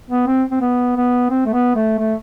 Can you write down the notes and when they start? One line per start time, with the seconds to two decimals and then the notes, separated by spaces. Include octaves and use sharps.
0.10 B3
0.27 C4
0.51 C4
0.61 B3
0.96 B3
1.30 C4
1.46 A3
1.53 B3
1.75 A3
1.98 A3